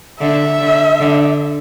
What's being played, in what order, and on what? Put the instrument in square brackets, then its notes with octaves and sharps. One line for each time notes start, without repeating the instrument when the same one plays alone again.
[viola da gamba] D3 [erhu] E5
[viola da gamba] D3
D3